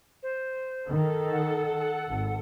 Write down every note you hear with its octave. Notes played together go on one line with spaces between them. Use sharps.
C5
D#3 A4
F#5
G#1